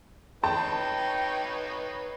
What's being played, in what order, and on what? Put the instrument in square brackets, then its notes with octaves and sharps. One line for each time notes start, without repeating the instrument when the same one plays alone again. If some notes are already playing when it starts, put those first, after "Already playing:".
[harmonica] D#4 B4 C#5 [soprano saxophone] G5 [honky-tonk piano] A5